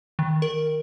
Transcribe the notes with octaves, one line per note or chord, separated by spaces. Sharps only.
D#3
A#4